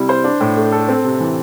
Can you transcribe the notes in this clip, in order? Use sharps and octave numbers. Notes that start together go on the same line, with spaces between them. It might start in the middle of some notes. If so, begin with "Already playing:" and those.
Already playing: C3 G3 E4
C5
D4
A2
A3
A4
C4
C3
E3